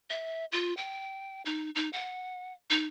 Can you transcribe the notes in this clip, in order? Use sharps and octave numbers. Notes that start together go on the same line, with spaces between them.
E5
F4
G5
D#4
D#4
F#5
D#4